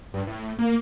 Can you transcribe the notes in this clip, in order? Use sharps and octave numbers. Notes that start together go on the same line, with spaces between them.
G2
A2
A#3